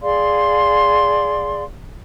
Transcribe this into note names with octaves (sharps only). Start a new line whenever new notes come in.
G#4 D5 F5 C6